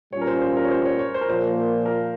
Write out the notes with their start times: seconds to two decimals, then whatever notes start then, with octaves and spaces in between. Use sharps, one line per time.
0.13 A#2 G3 C#4 F4 C#5
0.21 A#4
0.27 C5
0.41 C5
0.57 A#4
0.65 C#5
0.71 C5
0.86 C#5
0.99 C#5
1.14 C5
1.21 A#4
1.28 A#2 F3 A#3 C5
1.86 A#4